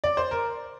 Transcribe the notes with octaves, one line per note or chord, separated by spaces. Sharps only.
D5
C5
A#4